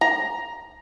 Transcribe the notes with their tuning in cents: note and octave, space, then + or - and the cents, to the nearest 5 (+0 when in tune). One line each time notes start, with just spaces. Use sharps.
A#5 +10